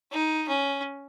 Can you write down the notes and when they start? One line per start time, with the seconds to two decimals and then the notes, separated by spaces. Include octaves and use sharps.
0.11 D#4
0.48 C#4